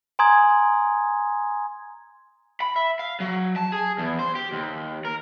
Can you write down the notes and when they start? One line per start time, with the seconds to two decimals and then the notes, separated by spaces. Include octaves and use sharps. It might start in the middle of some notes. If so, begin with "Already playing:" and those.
0.19 G#5 A#5 C6 D#6 G#6
2.61 B5
2.76 E5
2.99 F5
3.20 F#3
3.56 A5
3.72 G#4
3.98 E2
4.19 C5
4.35 G4
4.53 D#2
5.05 A#4